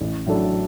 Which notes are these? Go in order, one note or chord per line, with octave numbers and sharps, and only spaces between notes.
A1
A2 F#3 D4 A4